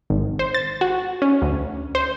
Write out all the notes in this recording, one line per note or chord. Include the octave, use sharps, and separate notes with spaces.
G#1
C5
A6
F#4
C#4
D2
C5